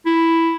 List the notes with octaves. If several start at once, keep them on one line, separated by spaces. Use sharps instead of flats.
E4